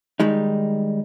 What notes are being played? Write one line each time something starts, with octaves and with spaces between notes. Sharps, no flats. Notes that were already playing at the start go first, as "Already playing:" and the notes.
D#3 G3 G#3 D#4